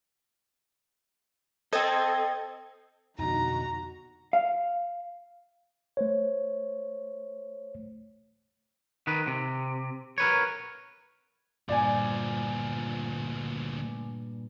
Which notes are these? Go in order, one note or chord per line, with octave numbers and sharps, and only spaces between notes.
A4 C5 D#5 G5 G#6
F2 B2 D3 D#4 F#4 A#5
F5
A3 C5 C#5
D#3 B4
C3
A#4 B4 C#5
D2 G2 A#2 F3 D5 G#5